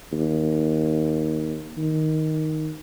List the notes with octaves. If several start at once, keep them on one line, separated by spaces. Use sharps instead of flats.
D#2
D#3